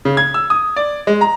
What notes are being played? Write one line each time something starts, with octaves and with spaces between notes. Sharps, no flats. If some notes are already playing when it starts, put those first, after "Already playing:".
C#3
G#6
E6
D#6
D5
G#3
A#5